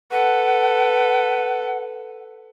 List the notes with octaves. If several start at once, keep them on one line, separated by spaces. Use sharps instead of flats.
A4 B4 F#5